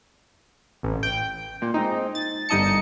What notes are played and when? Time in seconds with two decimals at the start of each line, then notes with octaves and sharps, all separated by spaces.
0.83 A1
1.03 G5
1.62 A#2
1.74 G#3 C4 D#4
2.15 A6
2.49 G1 G3 D#4 D#5 A5 C#7